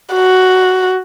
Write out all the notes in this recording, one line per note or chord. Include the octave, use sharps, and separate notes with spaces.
F#4